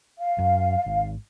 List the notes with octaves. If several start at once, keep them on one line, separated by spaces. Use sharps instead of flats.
F5
F#2
G#1